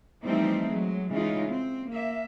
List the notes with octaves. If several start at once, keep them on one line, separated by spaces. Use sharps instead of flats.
E3 F3 G3 A3 C4 D#4
F#3 G#3
C#3 E3 G#3 D#4 F4
C4
A#3 E5